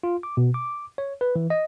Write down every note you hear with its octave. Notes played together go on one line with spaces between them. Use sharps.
F4
D6
B2
D6
C#5
B4
E3
D#5